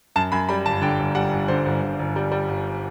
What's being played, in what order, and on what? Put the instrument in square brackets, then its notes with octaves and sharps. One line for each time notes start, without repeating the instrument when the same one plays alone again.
[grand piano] F#2 A5
F#2 B5
G3 B5
G1 A5
D3 G5
G1
G3 F#5
G1
D3 C5
G1
G1
G1
G3
G3
G1